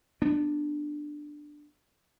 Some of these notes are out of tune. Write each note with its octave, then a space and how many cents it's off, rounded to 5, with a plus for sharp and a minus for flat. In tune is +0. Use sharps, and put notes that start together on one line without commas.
B3 +0 D4 +10